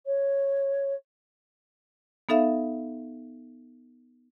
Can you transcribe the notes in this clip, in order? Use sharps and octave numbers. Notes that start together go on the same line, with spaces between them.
C#5
B3 D#4 A4 E5 F5